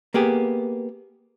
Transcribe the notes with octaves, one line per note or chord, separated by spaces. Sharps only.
A#3 B3 G4 G#4